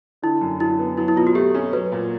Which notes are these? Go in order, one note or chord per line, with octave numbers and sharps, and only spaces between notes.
D3 E4
F#2
F#3 E4
B3
F#3 E4
E4
B2 F4
F#4
A3 G4
C#4
F#3 B4
A#2